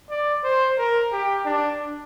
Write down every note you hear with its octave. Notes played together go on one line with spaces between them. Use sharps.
D5
C5
A#4
G4
D4